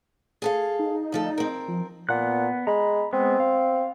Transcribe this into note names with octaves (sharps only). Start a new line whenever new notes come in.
G#4 A4 F5
D#4
D2 F3 A4
C4 A#4
F3
A#2 B3 F#5 F#6
G#3 A#5 B5
G#3 B3 C4
F5